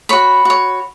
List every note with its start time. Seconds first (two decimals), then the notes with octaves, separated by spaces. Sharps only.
0.09 F#4 C#5 B5
0.45 F#4 C#5